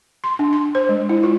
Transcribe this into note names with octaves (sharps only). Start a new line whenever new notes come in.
C6
D4
C6
C5
G#3
E4
F4